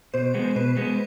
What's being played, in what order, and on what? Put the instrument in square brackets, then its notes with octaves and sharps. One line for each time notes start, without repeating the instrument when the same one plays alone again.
[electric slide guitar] B2 [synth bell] C5
[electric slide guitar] G#3 B3
[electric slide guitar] B2 [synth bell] B4
[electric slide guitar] G#3 B3 [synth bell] C5